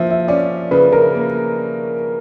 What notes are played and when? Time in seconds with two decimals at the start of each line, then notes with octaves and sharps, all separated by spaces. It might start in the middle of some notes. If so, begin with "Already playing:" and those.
Already playing: F3 A#3 E5
0.10 E5
0.28 C#4 D5
0.71 C#3 B4
0.92 A#4
1.15 A#3